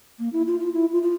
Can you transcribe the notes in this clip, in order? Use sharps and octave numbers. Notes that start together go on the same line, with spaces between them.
A#3
E4
F4
F4
E4
F4
F4